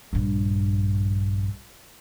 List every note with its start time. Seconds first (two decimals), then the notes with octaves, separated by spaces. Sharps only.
0.13 A#1 G2